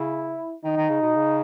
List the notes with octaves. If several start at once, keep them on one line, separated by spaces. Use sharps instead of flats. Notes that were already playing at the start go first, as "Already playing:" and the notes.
Already playing: C#3 E4
D#3 D#4
D#3
C#3
B2
C#3